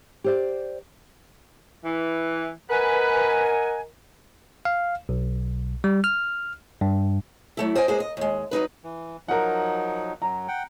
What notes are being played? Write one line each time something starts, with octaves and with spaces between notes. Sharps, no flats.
G4 C5 D5
E3
A#4 B4 D#5 F#5 G#5
F5
B1
G3
F6
G2
F#3 A3 E4
C5 D#5 G5 G#5
G#3 A#3 B3 G#4 C5
D#5
D#2 G#3
F#3 G3 D#4 B4
E3
F3 F#3 D#4 A#4 F#5
F#2 F#3 A#5
F#5 G5